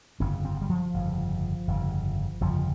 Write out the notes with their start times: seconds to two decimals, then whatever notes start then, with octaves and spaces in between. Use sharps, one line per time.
0.20 G1 F2 C#3 C4
0.45 C4
0.62 G3
0.69 F3
0.94 G1 F2 C#3
1.67 G1 F2 C#3
2.41 G1 F2 C#3 F3